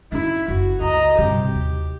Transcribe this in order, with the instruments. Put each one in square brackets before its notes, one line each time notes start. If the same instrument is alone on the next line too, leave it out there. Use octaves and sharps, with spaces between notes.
[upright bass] C#4 D#4 [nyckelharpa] E4
[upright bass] F#1 [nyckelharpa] F#4
[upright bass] C#2 [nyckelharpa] D#5 A#5
[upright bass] G2 C3 [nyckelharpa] G4
[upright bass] D#2